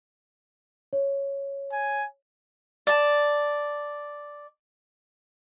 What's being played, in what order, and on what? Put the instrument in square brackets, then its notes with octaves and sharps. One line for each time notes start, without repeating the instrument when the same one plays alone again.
[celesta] C#5
[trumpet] G#5
[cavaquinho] D5 A5